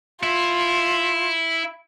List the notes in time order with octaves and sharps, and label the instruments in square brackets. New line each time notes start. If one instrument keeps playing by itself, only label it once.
[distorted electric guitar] E4 [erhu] F4